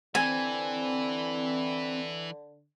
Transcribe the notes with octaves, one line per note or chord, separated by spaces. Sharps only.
D3 E3 C4 G#5